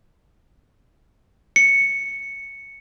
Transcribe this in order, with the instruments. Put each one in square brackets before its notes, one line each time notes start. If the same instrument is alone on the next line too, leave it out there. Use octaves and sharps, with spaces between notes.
[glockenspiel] C#7